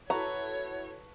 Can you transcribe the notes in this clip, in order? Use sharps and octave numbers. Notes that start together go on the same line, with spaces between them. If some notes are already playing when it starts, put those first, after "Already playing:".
E4 F#4 A4 B4 C#5 A5 A#5 C#6